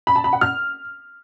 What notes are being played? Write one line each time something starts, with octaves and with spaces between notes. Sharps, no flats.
B5
A5
B5
F#5
F6